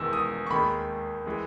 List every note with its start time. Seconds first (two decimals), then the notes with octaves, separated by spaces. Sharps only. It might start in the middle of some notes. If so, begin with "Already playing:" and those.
Already playing: E1 E2 D#3 G#3 E6
0.13 D#6
0.46 C#6
0.50 D#2 D#3 G#3 B5
1.26 E3 G#3